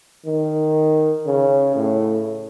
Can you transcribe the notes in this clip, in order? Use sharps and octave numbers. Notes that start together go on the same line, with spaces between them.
D#3
C#3
A2